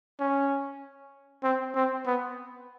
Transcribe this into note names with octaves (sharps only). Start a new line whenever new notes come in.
C#4
C4
C4
B3